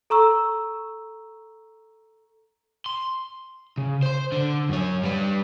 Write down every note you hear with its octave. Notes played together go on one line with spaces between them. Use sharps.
A4 A#5 C#6 E6
C6
C#3
C5 C6
D3
F#2 C#5
G3 B4